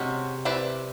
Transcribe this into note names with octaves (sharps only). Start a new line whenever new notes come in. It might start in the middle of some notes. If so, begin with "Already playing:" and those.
Already playing: C3 G#3 C#4 F#4
C4 E4 G4 B4 D5